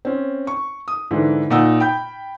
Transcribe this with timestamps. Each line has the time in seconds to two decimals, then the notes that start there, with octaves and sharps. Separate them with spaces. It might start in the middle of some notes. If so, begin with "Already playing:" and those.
0.05 C4 C#4
0.47 C#6
0.88 D#6
1.11 G#2 D3 E3
1.50 A#2 D#4 F#5 E6
1.80 G5 B5 G6